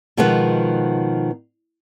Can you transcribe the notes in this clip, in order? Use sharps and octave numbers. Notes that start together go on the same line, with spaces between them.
B2 D#3 F3 G#3 B3